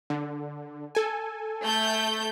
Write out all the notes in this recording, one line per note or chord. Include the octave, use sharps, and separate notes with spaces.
D3
A4 G#5
A3 G6